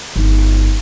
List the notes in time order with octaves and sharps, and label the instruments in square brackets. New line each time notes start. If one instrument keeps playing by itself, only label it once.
[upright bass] G1 D#4